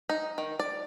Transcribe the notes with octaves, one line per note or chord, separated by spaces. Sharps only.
D#4
D#3
D5